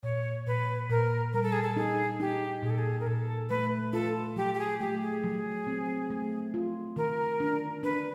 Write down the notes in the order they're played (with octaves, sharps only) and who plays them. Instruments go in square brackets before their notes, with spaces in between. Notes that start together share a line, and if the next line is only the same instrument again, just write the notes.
[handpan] A#2 [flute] C#5
[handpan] A#2 [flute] B4
[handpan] A#2 [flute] A#4
[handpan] G3 [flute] A#4
[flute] A4
G#4
A4
[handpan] D#4 [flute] G#4
[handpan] D#4 [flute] G4
[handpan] A#2 [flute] G#4
[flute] A4
G#4
A#4
[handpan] A#2 [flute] A4
[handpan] A3 [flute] B4
[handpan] F4 [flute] A4
[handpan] F#3 [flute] G4
[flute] G4
G#4
[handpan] A3 [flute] G4
[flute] G#4
[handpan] F#3
C4
A3
F4
[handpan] D#3 [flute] A#4
[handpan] D4
[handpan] D4 [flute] B4